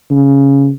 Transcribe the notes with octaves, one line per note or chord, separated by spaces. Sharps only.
C#3